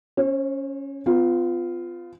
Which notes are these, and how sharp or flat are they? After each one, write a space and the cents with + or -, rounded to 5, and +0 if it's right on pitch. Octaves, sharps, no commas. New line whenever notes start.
C#4 +0 C5 +45
B3 +40 F4 +0